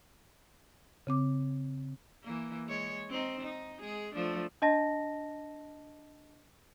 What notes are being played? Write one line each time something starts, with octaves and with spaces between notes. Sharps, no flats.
C#3 C4 D6
E3 A#3
G#3 C#5
C4 D#4
D#4
G#3 G#4
F3 A3 D4
D4 D#5 A5 A#6